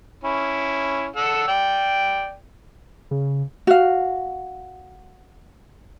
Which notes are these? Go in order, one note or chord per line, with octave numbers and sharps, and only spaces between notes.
C#4 E4
A4 F#5 E6
D5 G5
C#3
F#4 F5